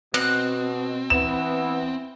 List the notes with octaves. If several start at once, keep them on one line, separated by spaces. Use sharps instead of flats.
B2 C4 F#6
E3 B3 E7